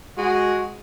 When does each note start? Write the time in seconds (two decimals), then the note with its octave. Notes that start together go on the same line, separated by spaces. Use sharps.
0.17 G#3 F#4